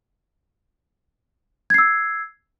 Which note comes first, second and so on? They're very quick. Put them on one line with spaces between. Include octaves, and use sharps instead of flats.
G#6 C7 E6